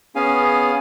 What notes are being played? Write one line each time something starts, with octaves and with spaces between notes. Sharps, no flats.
B3 C#4 G#4 F5 G#5